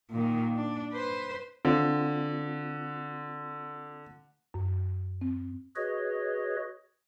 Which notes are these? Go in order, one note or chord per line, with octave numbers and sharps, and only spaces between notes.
A#2 D#3
D4
B4 C5
D3 C4 F4
F#2
C4
F#4 G#4 B4 C#5 D#5